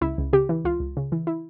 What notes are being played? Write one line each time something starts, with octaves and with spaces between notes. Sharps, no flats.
C#2 E4
C#2
C#3 G4
E3
C#2 F4
C#2
C#3
E3
E4